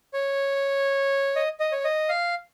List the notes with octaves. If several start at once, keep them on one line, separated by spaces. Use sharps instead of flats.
C#5
D#5
D#5
C#5
D#5
F5